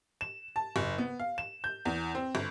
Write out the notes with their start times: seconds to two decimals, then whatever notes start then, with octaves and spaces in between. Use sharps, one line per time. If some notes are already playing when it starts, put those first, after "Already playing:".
0.21 E7
0.56 A5
0.76 F#1
0.98 B3
1.20 F5
1.38 E7
1.64 G6
1.85 E2
2.15 C4
2.35 G1